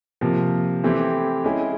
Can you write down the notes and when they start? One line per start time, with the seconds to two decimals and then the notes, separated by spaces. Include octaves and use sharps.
0.21 C3 F3 A#3
0.84 E3 A3 C4 E4 G4
1.44 G#3 C#4 E4 G#4